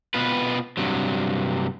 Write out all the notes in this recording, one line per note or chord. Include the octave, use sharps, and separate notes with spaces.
B2 B3 C4 F4 B4
G2 C3 F#3